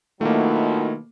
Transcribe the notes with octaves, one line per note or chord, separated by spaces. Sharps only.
B2 D#3 F#3 A3 A#3 E4 F4